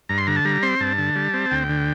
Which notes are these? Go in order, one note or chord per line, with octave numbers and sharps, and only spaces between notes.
G2 A#5
C6
D3 A#5
A5
G3 A#5
C4 C6
G2 A5
D3
G3
C4
D2 G5
D3